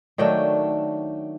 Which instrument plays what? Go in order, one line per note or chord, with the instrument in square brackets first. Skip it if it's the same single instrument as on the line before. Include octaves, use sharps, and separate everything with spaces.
[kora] D#3 F#3 A3 D4 G5